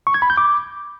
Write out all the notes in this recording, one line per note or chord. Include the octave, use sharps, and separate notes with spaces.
C#6
G#6
B5
G6
D6